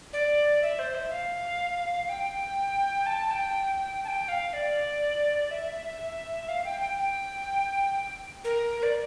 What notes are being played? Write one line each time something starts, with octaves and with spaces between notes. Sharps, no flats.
D5
E5
C5
E5
F5
G5
A5
G5
A5
G5
F5
D5
E5
F5
G5
G5
G5
A#4
D5